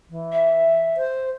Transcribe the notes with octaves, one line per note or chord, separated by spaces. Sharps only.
E3
E5
C5